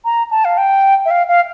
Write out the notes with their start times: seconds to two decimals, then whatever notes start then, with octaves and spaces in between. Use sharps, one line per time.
0.05 A#5
0.31 A5
0.45 F5
0.58 G5
1.05 E5
1.11 F5
1.28 F5